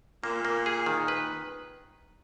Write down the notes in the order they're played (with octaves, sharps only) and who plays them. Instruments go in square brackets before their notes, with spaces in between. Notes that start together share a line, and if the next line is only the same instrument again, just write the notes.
[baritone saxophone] A#2 [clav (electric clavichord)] A#3
[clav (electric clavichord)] A#3
G#4
D#3
B4